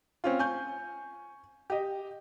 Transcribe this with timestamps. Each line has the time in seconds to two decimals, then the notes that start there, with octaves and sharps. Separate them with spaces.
0.24 C4 C#4 F4
0.39 G#5 C#6 G6
1.70 G4 D#5